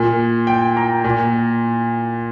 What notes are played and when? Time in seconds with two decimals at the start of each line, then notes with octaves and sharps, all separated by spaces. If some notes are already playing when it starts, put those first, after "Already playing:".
Already playing: A#2
0.47 G5
0.77 A#5
1.04 A#2